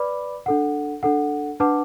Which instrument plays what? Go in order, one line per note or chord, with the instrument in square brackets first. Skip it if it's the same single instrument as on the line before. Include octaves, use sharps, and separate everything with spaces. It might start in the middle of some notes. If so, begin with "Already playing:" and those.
Already playing: [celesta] B4 D5 B5 D6
D4 A4 F#5
D4 A4 F#5
D4 B4 F#5 A5 D6